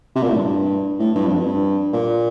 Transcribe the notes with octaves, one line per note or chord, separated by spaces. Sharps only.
C3
A#2
A2
G2
A2
G2
F2
G2
A#2